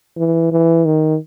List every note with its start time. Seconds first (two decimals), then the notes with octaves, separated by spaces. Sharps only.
0.17 E3
0.52 E3
0.86 D#3